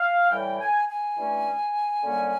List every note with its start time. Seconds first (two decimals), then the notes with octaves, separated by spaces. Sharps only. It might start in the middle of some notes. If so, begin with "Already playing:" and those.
Already playing: F5
0.30 A2 E3 G3 G5
0.59 G#5
0.88 G#5
1.17 G2 E3 A3 C#4
2.03 F#2 D3 G3 A#3 C#4